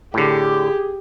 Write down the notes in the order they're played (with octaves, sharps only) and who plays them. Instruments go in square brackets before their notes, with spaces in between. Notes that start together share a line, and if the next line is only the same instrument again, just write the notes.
[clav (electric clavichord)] A2 D3 [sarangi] G4 [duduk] G#4